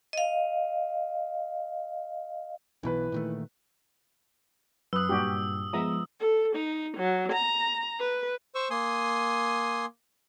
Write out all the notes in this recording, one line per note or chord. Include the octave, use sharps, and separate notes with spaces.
D#5 F5
B1 B2 E3 B4
A#2 D#3 A3
F#2 B4 D#6 E6 F#6
G2 A#2 D4 F#4 G4
F3 G#3 B3 E5 A#5 D#6
A4
D#4
F#3
A#5
B4
C5 C#6 E6
A#3 G#5 C6 D#6